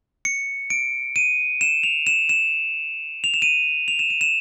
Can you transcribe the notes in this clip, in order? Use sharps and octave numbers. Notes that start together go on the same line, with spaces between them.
C#7
D7
D#7
E7
F7
E7
E7
F7
E7
D#7
F7
E7
D#7
E7